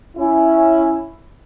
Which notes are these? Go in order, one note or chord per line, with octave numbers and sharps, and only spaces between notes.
C#4 E4